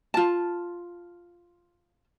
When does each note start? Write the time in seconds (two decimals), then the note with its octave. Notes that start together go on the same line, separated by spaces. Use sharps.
0.14 F4 A5